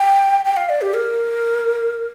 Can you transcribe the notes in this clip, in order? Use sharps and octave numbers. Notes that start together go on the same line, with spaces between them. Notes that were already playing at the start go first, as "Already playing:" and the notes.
Already playing: G5
G5
F5
D5
G4
A#4